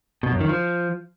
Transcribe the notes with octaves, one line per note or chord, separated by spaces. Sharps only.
B2
F#2
D#3
F3